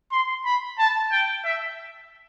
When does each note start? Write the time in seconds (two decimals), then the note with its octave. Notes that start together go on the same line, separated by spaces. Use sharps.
0.12 C6
0.45 B5
0.79 A5
1.12 G5
1.45 E5